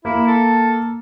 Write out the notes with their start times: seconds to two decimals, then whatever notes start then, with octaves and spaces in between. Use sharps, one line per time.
0.05 A#3 E4
0.27 A4